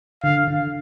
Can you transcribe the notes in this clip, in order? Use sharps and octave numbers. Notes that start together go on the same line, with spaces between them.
D3 F5
D3